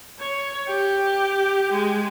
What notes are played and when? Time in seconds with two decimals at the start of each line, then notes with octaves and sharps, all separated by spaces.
0.19 C#5
0.67 G4
1.72 G#3